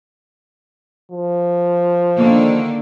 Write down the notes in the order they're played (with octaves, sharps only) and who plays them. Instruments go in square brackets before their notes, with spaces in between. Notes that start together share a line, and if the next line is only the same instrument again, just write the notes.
[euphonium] F3
[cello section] D3 D#3 A#3